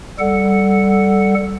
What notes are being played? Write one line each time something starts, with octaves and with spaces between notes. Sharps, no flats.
G3 A4 F#5